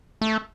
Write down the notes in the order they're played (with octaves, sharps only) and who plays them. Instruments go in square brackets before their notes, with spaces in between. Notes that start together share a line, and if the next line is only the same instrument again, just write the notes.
[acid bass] A3